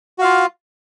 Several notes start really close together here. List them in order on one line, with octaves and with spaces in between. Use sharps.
F#4 F5 F4